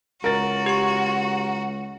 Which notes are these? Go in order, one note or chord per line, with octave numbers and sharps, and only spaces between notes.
C#2 F#4 A#4 A6
G4 C#6